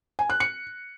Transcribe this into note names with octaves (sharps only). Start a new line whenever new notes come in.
G#5
F#6
C#7